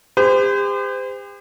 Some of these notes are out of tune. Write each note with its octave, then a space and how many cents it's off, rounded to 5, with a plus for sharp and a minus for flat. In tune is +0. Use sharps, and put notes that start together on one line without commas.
G4 +45 C5 -35